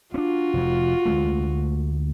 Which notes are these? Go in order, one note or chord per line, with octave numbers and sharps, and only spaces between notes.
C4 D4 F4 F#4
F1 F2
D2 G#3 A3